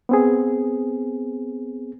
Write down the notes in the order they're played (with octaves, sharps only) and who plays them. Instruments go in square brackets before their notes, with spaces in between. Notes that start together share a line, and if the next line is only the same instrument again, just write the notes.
[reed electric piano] B3 C4 G#4